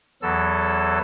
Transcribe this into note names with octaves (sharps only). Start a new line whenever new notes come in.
E2 E3 F#3 A4 E6